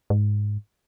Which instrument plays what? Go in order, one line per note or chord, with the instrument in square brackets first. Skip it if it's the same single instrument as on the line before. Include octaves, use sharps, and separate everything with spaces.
[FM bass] G#2